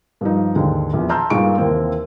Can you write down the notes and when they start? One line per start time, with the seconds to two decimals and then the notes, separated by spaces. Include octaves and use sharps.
0.21 G2 F3 D#4
0.55 D#2 G#2 D3
0.93 A#1 E2
1.09 A5 A#5 C6 E6 F6 G6
1.30 G2 A#2 G#3 D#4 C#6 D7
1.58 D#2 C3 E3 A#3 C4